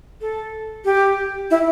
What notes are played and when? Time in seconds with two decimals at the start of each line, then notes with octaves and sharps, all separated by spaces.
0.21 A4
0.85 G4
1.51 E4